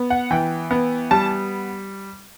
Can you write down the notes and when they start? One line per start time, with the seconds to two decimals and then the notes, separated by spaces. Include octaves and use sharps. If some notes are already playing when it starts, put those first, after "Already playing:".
Already playing: B3
0.10 F#5
0.31 E3 G5
0.71 B3
1.11 G3 A5